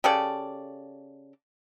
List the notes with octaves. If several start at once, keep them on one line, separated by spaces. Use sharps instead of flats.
C#3 G4 A4 D5